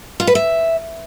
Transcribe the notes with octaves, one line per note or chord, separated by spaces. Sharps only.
F4
B4
E5